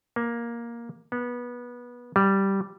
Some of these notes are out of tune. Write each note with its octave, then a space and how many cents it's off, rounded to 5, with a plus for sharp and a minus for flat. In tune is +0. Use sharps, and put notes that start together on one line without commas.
A#3 +10
B3 -20
G3 -5